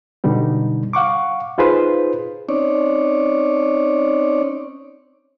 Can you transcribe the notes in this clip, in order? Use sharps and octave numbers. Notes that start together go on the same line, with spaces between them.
F#2 B2 D3 G3 D#4
F5 F#5 C#6 D6
D#4 F4 G#4 B4 C5
C4 C#4 D#4 C#5 D5